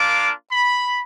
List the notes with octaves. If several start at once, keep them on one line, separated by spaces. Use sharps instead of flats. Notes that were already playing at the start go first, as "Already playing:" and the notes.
Already playing: A#3 D4 F4 D6
B5